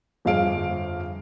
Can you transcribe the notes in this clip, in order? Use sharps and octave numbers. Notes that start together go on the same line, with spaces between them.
G1 F2 G#4 F5 D7